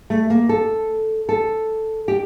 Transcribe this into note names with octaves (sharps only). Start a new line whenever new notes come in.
A3
A#3
A4
A4
G4